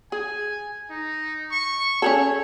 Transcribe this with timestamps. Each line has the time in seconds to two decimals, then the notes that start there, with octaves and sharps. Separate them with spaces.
0.12 G#4 G#5
0.90 D#4
1.51 C#6
2.02 C#4 G#4 A4 C#5